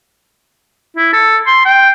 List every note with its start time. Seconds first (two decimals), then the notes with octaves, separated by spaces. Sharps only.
0.97 E4
1.13 A4
1.46 C6
1.65 G5